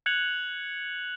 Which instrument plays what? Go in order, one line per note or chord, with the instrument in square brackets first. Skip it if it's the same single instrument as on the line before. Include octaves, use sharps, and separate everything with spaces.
[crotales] F#6 G#6 C#7 F7 F#7